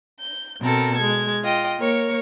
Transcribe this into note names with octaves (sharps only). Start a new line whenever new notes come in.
G6
B2 C4 A4 A#4
G#3 G#6
F4 D#5 G5
A#3 A#4 C#5 C#6